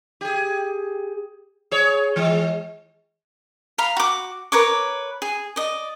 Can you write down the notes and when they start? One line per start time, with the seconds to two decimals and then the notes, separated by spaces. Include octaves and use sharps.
0.21 G4 G#4
1.71 G#4 C#5
2.16 E3 G#3
3.78 F5 A#5 B5
3.97 F#4 D6
4.52 A#4 B4 C#5 D6
5.22 G#4
5.56 D5 D#5